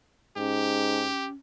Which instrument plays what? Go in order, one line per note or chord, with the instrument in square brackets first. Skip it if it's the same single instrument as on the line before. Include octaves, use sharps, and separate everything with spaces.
[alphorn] G#2 [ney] C#4 [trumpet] G4